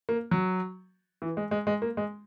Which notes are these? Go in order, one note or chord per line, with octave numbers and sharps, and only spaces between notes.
A#3
F#3
E3
G#3
G#3
G#3
A#3
G#3